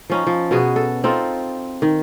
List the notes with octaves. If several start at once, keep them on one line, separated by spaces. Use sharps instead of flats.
F3 C#4 D#4
F3
B2 B3 F#4 G#4
A4
C4 D#4 F4 A4
D#3